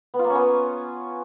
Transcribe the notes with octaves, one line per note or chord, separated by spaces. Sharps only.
B3
F4
A#3
C#4
B3